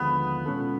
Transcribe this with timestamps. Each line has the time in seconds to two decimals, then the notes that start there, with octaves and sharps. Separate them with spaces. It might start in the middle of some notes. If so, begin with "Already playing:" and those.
Already playing: D#2 D3 F3 G#3 B3 B4
0.46 B2 G#3 C#4 F4 A4